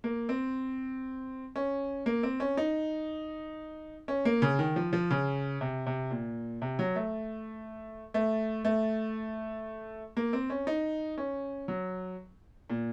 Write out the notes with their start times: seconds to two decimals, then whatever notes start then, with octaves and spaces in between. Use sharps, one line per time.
0.04 A#3
0.29 C4
1.56 C#4
2.06 A#3
2.23 C4
2.40 C#4
2.57 D#4
4.08 C#4
4.25 A#3
4.42 C#3
4.59 D#3
4.76 F3
4.93 F3
5.10 C#3
5.61 C3
5.86 C3
6.11 A#2
6.62 C3
6.79 F#3
6.96 A3
8.14 A3
8.65 A3
10.17 A#3
10.33 C4
10.50 C#4
10.67 D#4
11.18 C#4
11.68 F#3
12.70 A#2